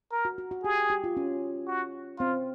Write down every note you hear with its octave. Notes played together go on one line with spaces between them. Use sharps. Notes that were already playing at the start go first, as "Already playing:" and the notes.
A#4
F#4
F#4
F#4
G4 G#4
G4
F4
C#4
F#4
C4 F4